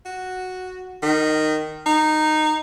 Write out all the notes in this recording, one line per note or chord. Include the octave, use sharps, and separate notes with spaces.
F#4
D#3
D#4